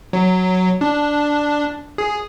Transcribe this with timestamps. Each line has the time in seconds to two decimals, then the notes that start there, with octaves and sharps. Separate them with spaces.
0.13 F#3
0.81 D4
1.98 G#4